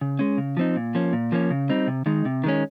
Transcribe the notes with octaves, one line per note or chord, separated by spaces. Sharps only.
C#3
G#3 C#4
C#3
F3 C4 D#4
A#2
F3 A#3 C#4
A#2
F3 A#3 C#4
C#3
G3 C4 D#4
C3
D#3 G#3 D#4
C3
D#3 G#3 C#4